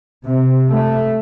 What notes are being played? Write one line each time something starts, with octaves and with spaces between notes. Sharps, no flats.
C3
A3